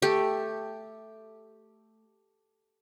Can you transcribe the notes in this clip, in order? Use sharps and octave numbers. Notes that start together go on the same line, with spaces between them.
A3 G4